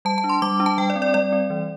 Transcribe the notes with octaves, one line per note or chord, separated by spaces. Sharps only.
G3 A5
A5
D4
C6
G3 D6
D4
A5
G3 G5
D5
C4
D5
G3 D5
C4
E3